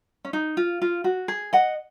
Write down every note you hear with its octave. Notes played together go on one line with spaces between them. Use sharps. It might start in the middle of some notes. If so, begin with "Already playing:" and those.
C#4
D#4
F4
F4
F#4
G#4
D#5 F#5